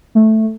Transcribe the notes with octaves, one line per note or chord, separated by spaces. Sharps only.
A3